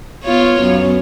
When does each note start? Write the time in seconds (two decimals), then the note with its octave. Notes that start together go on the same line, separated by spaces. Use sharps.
0.24 B3 F4 C#5
0.61 F#2 B3